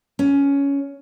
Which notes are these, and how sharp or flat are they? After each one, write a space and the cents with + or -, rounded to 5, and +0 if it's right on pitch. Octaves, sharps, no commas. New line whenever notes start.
C#4 +15